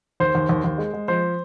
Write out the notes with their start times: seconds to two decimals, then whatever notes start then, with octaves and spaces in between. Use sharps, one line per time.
0.20 D#2 C5
0.35 D#2
0.49 D#2
0.64 D#2
0.78 G#3
0.94 G#3
1.08 F3 C5